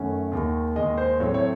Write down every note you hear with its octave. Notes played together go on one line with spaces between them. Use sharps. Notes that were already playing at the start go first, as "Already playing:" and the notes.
Already playing: F#2 D#3 A3 C#4 F#5
D#2 D#3 G#3
D#2 D#3 G#3 D#5
C5
A2 F#3 A3 C4 C#5
C#5